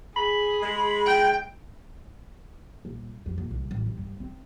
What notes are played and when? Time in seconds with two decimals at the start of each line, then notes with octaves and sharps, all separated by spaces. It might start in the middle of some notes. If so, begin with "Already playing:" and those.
0.17 G#4 B5
0.63 G#3
1.07 G5
2.85 D#1
3.26 F2
3.38 A#2
3.51 C2
3.71 A1
3.86 G3
3.99 G2
4.20 C4